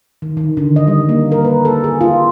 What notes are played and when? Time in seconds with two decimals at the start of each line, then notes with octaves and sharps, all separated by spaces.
0.22 D#3
0.37 D#3
0.57 D3
0.76 D#5
0.87 G3
1.09 A#3
1.32 A#4
1.45 B4
1.65 A4
1.84 G#4
2.01 F4